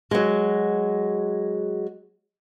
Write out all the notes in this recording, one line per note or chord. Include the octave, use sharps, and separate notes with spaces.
F#3 G#3